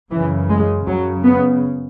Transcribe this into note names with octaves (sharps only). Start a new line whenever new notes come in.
F#2 C#3 E3
G#3
F#2 C#3 F#3
B3